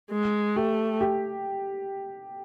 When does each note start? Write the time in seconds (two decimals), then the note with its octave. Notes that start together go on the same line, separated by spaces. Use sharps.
0.11 G#3
0.56 A3 G4
1.01 G4